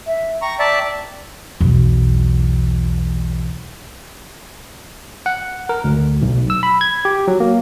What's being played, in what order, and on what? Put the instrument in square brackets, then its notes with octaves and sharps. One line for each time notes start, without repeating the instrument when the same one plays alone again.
[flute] E5
[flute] G5 [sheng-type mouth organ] A#5 C#6
[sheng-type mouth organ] D5 E5 A5
[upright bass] B1 E2
[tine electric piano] F#5
A#4
D2
B1
E6
B5
G#6
G4
F#3
A#3